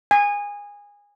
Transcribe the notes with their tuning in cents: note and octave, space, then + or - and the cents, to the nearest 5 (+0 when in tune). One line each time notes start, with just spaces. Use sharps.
G#5 -20